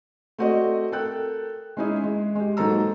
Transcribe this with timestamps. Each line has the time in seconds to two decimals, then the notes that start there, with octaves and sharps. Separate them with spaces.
0.38 A3 C4 F#4 D5 D#5
0.92 A4 A#4 G5 F#6
1.77 G#3 C#4 D#4 E4 G#4
2.04 G#3
2.35 G#3 G4
2.57 G#2 F#3 A#3 A4 A#5 E6